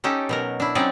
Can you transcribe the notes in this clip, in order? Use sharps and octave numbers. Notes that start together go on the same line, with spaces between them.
C#4 D#4 G4 A4
B2 F#3 A#4
D4 E4
F#3 C4 C#4 D#4 D5